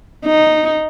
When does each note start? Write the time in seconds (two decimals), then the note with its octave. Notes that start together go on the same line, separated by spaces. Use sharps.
0.25 D#4